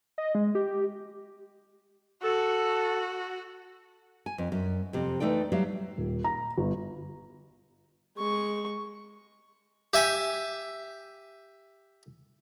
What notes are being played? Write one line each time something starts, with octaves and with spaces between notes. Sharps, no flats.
D#5
G#3
G4
F#4 A4
G#5
F2
F#2
F2 C3
E3 F#3 A3 D#4 D5 G5
F#3 G3 C5 E5 F5
D#1
A#5
G1
G#3 C#6
G4 E5 G#5